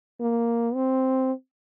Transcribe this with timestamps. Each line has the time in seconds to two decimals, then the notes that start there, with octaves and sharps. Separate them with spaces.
0.20 A#3
0.75 C4